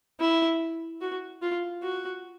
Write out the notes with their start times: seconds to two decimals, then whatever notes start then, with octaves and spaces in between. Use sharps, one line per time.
0.20 E4
1.01 F#4
1.42 F4
1.83 F#4